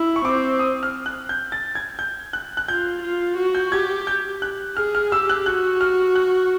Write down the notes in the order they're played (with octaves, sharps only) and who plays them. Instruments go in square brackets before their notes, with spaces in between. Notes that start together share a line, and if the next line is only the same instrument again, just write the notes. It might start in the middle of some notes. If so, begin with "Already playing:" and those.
Already playing: [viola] E4
[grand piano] C#6
[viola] C4 [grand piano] D6
[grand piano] D#6
F6
F#6
G6
A6
G#6
G6
F#6
F#6
[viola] F4 [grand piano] G6
[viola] F4
F#4
[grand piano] G6
[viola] G4 [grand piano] G#6
[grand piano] G6
F#6
[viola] G#4 [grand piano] F6
[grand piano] F6
[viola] G4 [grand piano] E6
[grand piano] F#6
[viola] F#4 [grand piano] F#6
[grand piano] F6
F#6